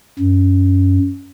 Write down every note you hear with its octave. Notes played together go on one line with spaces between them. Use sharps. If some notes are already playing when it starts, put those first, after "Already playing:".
F#2